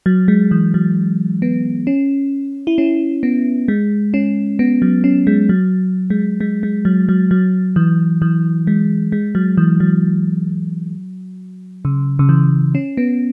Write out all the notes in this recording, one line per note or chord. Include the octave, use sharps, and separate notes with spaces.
F#3
G#3
E3
F#3
B3
C#4
E4
C#4
B3
G#3
C#4
B3
F#3
C#4
G#3
F#3
G#3
G#3
G#3
F#3
F#3
F#3
E3
E3
G#3
G#3
F#3
E3
F#3
C#3
C#3
E3
C#4
B3